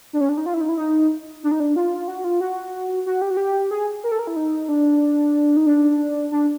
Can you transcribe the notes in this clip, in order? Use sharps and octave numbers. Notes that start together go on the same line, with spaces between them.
D4
C#4
D4
D#4
F4
E4
D#4
E4
D#4
D4
D#4
D4
F4
F#4
F4
F#4
F#4
G4
F#4
G4
G#4
A#4
A4
A#4
E4
D#4
D4
D#4
D4
D4